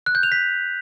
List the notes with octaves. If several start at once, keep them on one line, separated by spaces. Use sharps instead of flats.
F#6
G6
F7
B6